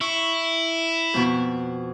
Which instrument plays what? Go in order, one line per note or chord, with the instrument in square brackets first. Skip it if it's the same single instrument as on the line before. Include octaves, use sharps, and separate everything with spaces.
[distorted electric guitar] E4 [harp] C#6
[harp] F2 B2